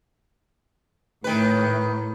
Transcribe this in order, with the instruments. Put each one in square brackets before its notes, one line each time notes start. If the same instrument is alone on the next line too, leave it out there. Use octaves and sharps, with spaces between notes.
[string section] A2 [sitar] D#3 B4